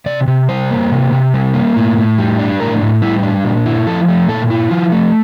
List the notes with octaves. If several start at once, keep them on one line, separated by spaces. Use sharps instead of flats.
C3 D5
C3
G3 C5
A#3
C3
C3
G3
A#3
A2
A2
G3
D4
A2 A#4
A2
G3 E4
D4
A#2
E4
F3 A4
A3
A#2 A4
E4
F3 F4
A3